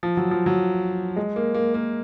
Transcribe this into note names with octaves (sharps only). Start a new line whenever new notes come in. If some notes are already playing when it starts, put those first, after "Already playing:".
F3
F#3
F3
F#3
G#3
A#3
A#3
A#3